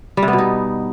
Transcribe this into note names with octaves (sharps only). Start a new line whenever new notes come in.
G3
C3
B3
B2
D#4